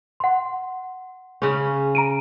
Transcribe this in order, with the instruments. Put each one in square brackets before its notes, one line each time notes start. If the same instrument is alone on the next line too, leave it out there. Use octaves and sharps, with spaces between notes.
[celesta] F#5 C6
[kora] C#3 C#4
[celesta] A#5 D7 D#7